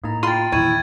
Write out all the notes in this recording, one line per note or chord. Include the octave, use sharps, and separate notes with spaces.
A2 A#3 D#4 A#5
F4 G5 B5 C6 F6 A6 D#7
E2 A#2 D#3 E4 C#6 G#6 D#7